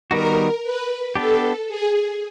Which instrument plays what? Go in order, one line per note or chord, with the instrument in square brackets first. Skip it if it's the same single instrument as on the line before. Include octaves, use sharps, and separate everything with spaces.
[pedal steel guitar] D#3 G3 B3 D#4 F#4 [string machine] A#4
[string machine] B4
[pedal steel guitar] B3 D4 G4 [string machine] A4
[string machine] G#4